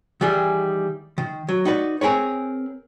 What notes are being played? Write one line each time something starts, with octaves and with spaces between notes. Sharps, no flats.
D#3 E3 G3 G#4
D#3
F#3
D#4 F#4 B4 D5
C4 G#4 A#4 B4 C#5